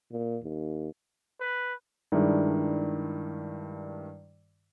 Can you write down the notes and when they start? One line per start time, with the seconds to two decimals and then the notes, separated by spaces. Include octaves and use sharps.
0.12 A#2
0.43 D#2
1.41 B4
2.12 G2 D#3 G#3 D4 E4